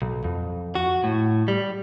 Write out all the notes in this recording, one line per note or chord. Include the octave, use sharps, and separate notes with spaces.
B1
F2
F#4
A2
G3